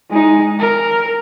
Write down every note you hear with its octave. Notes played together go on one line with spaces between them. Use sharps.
G#3 D#4
A#4